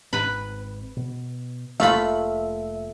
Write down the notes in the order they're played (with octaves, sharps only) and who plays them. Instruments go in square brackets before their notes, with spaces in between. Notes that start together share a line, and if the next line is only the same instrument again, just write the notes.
[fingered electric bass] G#1 G#2 C4 [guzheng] B4 B5
[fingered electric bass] B2
[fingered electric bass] F1 F2 A#3 [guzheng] A3 F4 B5 [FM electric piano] E5